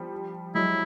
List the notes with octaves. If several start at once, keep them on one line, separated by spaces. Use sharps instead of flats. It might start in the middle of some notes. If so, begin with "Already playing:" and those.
Already playing: F3 G3
F#3 G#3 E4